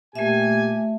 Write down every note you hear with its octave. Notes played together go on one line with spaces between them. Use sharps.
A#2 A3 G4 E5 G#5